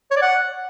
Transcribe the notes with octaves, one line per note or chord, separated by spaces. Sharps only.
C#5
D5
F#5